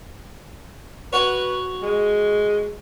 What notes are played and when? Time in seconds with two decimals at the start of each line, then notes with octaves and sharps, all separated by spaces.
1.13 F#4 B4 C#5
1.82 G#3